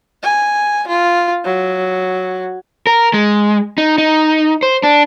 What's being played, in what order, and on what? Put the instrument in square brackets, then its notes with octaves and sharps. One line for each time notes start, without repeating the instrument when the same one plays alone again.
[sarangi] G#5
F4
F#3
[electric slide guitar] A#4
G#3
D#4
D#4
C5
D4